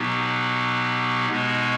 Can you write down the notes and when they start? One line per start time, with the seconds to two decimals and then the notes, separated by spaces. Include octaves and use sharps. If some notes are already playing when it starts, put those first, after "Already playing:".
Already playing: B2 F#3 B3 D#4 G4
1.29 B2 G#3 B3 D#4 F#4